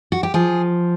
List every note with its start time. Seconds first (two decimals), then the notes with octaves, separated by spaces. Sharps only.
0.12 F#4
0.23 G4
0.34 F3 G#4